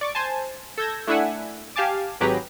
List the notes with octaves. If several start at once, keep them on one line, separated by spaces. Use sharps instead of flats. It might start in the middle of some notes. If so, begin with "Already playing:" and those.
D5 C#6 D6
C5 G#5 A5
A4 E6 G6 G#6 A#6
A3 D4 E4 E5 F#5 G#5
G4 F5 G#5 A5 D6
G#1 F#3 G4 G#4 B4 A#5